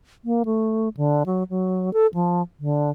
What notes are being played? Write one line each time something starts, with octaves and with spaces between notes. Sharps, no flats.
A#3
A3
D3
F#3
F#3
A4
F3
D3